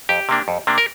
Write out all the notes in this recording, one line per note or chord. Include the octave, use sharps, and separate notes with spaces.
F2 G4
C3 A#3 D4
F2
C3 A#3 D4
A#4